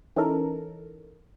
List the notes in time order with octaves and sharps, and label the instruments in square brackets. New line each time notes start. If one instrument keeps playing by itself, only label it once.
[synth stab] E3 C#4 D#4 A4 A#4